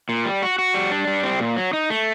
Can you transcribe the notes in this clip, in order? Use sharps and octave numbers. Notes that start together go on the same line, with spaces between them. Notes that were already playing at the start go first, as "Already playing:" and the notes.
A#2
G3
F#4
F#4
G3
D4
G3
C4
A#2
F#3
D#4
A3